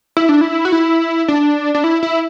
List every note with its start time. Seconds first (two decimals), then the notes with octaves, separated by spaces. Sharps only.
0.17 E4
0.29 D4
0.41 E4
0.65 F#4
0.72 E4
1.28 D4
1.75 D4
1.84 E4
2.03 E4